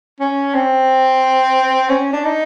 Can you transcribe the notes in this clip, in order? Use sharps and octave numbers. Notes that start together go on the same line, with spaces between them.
C#4
C4
C#4
D4
D#4